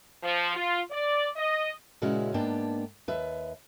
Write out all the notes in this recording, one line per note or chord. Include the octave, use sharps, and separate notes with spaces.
F3
F4
D5
D#5
A#2 C#3 G#3 C#4 E4 F#4
G#2 A#3 B3 D4 G5 A5
D#2 B4 E5